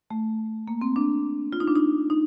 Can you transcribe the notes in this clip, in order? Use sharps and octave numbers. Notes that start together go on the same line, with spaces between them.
A3
A#3
C4
D4
F4
D#4
D4
D#4
D#4